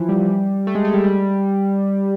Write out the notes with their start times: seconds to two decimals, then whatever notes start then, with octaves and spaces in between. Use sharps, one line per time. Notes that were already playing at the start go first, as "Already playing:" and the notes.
Already playing: E3 F3
0.09 G3
0.67 A3
0.75 G#3
0.85 A3
0.94 G3
1.04 G3